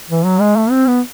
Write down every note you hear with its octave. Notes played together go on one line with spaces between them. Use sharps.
E3
F#3
G#3
A3
C4
B3